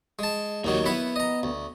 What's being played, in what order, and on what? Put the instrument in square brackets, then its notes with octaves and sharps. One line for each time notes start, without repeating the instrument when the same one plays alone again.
[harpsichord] G#3 A5
[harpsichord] D#2 D#3 F#3 [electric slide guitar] A#3 F#4
[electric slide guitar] B3 [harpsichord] E4 F#5 B5
[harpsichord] D#5 A#5
D2